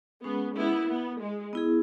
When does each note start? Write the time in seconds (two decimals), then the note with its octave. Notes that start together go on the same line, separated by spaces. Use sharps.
0.23 G#3 B3 C#4 G#4
0.56 B3 E4
0.88 B3
1.21 G#3
1.53 B3 E4 G#4